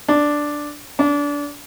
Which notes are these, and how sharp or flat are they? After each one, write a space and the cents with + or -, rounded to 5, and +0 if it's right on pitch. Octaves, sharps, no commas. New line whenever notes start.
D4 +0
D4 -25